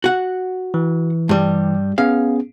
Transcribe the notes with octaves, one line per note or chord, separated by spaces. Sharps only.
F#4 F#5
E3
G2 G3
B3 C#4 G#4 F5